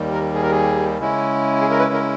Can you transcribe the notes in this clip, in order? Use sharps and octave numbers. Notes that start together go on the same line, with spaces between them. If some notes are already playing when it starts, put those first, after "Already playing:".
Already playing: D#2 D#3 G3
A#4
G#4
A#4
G#4
C#3 G#3 C#4 E4
G#4
A#4
B4
A#4